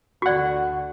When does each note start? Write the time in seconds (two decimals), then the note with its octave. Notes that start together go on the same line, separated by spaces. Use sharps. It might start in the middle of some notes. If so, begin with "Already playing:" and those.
0.22 D2 D3 F#4 D5 F#5 C#6